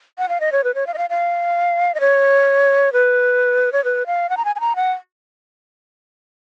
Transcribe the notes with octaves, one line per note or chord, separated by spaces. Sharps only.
F#5
F5
D#5
C#5
B4
C#5
F5
D#5
F5
F5
D#5
C#5
B4
C#5
B4
F5
F#5
A#5
G#5
G#5
A#5
F#5